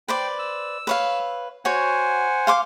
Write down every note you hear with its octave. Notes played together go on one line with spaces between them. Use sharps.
B4 C5 D5 G5
E6
B4 C#5 F5
F#4 C5 C#5 F#5 G#5
F5 C6 D6